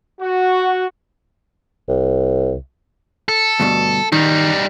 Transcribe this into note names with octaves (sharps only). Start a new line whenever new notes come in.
F#4
C2
A4
D2 G2 B2
D#3 G3 D#4